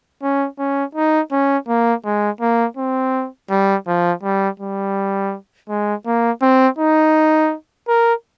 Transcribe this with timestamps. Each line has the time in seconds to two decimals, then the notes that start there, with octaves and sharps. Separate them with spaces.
0.23 C#4
0.59 C#4
0.95 D#4
1.32 C#4
1.68 A#3
2.05 G#3
2.41 A#3
2.77 C4
3.50 G3
3.87 F3
4.23 G3
4.60 G3
5.69 G#3
6.06 A#3
6.42 C4
6.79 D#4
7.88 A#4